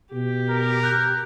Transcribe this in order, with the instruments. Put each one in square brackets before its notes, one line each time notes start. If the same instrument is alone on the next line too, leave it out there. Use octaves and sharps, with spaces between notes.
[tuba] B2 [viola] G4
[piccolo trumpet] A#4
[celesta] F#6 G6